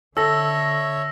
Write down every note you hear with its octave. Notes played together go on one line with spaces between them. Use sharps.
D3 A4 C#5 E5 E6 A#6